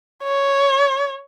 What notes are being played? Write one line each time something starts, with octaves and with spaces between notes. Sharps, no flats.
C#5